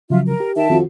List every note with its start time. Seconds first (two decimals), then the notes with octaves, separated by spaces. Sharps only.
0.10 C#3 F3 F#3 F4 E5
0.26 A#4
0.40 G4
0.56 D#3 E5 G5 A5
0.70 F2 D#3 C4 F#4